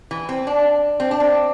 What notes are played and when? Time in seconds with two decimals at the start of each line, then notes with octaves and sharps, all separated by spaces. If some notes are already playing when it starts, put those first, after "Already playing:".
0.11 E3
0.29 C4
0.47 D4
1.00 C4
1.11 D4
1.20 C4